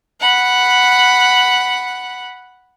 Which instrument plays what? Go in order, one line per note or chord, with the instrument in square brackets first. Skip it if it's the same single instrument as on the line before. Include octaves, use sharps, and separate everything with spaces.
[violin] F#5 B5